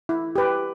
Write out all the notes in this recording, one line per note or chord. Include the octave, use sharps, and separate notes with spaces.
E4
G4 B4